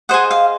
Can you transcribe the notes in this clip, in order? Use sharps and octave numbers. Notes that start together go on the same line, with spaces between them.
G#4 C5 D#5 F#5
F5